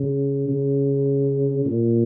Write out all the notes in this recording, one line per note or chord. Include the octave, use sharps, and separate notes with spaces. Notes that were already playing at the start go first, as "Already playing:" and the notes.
Already playing: C#3
C#3
A#2